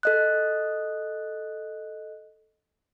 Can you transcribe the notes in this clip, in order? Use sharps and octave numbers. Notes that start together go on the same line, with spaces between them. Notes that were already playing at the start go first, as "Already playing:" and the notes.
A4 D#5 F#6